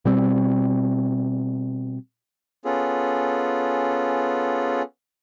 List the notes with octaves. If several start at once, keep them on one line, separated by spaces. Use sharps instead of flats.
B2 G3 C4
B3 C#4 F4 G#4 A4